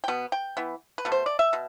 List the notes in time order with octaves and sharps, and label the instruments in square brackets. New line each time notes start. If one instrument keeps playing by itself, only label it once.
[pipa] G5
B2 B3
G5
E3 B3
B4
B2 A3
C5
D5
E5
B2